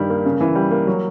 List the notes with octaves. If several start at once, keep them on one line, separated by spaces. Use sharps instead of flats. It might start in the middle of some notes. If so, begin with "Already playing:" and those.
Already playing: G2 D#3 G3
A#3
C#3
E3
G3
A#3
F#3